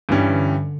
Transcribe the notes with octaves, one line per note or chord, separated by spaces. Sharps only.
G2 D3 E3 G3 C#4